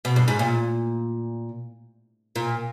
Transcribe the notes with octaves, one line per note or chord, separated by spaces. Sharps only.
B2
G2
G#2
A#2
A#2